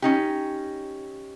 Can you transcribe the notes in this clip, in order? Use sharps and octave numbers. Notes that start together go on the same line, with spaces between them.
C#4 D#4 G4